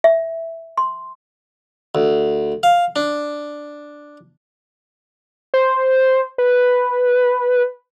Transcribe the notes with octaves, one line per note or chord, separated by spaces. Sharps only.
E5
C6
D2
F5
D4
C5
B4